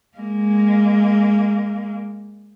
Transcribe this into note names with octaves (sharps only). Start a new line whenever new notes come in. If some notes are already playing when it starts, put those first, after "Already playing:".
G#3 A#3